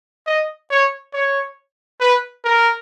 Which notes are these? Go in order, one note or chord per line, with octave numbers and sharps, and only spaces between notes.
D#5
C#5
C#5
B4
A#4